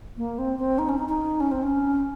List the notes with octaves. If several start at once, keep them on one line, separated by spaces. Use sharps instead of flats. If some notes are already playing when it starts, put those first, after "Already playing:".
A#3
C4
C4
D#4
C#4
D#4
D#4
C#4
C4
C#4